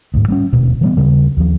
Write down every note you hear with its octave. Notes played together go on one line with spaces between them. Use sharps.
D2 G#2
G3 A#3 C#4
D#1 D2 B2
E3 G3 B3
D#2 C#3 G3
D#2 F3